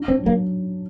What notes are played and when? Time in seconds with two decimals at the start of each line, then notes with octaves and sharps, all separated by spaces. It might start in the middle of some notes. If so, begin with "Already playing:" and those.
Already playing: D4
0.08 C4
0.18 F#3
0.26 A#3